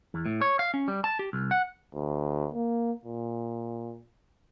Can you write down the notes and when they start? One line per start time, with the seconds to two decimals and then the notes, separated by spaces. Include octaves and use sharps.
0.14 E2
0.26 A2
0.41 C#5
0.59 F5
0.74 C#4
0.88 G3
1.04 A5
1.19 G4
1.33 C2
1.51 F#5
1.94 D2
2.54 A#3
3.05 A#2